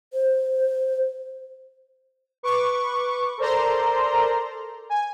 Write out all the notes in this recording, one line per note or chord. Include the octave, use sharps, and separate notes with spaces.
C5
B4 C#6 D6
A4 A#4 C5 D5 A#5 C6
G#5